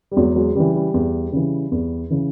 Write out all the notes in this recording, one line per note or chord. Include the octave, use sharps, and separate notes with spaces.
G3
E2 F#3 G#3
F#3 G#3
C#3 E3 G3
G3
E2
C#3 E3
E2
C#3 E3